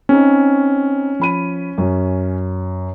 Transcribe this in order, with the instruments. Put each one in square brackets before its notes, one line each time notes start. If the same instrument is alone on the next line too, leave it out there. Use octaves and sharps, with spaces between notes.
[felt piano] C4 D#4 [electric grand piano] C#4
[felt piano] F3 B5 D#7
F#2